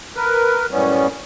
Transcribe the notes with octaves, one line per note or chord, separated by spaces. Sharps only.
A#4 B4
F#2 A2 G3 B3 C#4